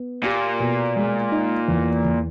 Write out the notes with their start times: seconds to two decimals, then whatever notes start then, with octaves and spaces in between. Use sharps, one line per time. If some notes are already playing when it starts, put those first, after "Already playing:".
Already playing: B3
0.23 A#2 G4
0.60 B2
0.96 G#3
1.32 D#4
1.68 E2
2.05 E2